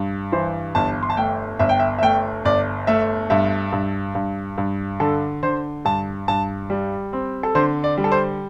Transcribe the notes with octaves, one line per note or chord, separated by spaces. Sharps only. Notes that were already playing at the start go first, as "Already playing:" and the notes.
Already playing: G2
E3 C5
G1 A5
C6
A5
A3 G5
G1 E5
G5
E5
E5
A3 G5
G1 D5
A3 E5
G2 E5
G2
G2
G2
D3 A4
D3 C5
G2 A5
G2 A5
G3
C4
A4
D3 C5
D5
G3
A4
C5